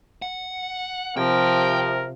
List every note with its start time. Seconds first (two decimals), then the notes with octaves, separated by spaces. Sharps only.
0.22 F#5
1.17 C3 F3 A#4 G5